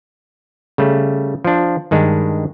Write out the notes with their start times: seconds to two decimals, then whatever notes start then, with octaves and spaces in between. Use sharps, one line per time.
0.78 C#3 G3 A3
1.44 F3 D4
1.91 G2 D#3 G#3 D4